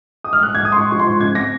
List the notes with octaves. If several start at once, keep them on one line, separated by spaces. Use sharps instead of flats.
D#6
G#2 F6
F#6
G#2
G#6
G#2 D#6
C6
G#2 C#6
F3 C#6
C6
G#2
C#3 G#6
C4 A#6